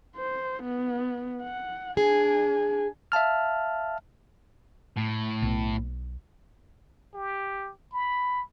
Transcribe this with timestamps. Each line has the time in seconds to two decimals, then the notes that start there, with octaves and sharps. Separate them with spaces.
0.16 C5
0.63 B3
1.42 F#5
1.97 D4 G#4 G#5
3.12 E5 F5 A5 F6
4.97 A2
5.42 B1 B2
7.14 G4
7.92 B5